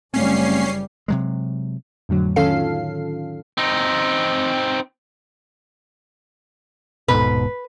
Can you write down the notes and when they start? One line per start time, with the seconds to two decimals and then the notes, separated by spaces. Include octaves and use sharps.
0.14 F#1 G3 A3 C4 C#4 C7
1.08 C3 F#3 G#3
2.09 F2 A2 D3 F#3
2.36 D#3 C#4 F4 A4 F5 C7
3.58 C4 D#4
7.08 D#1 G#2 B2 B4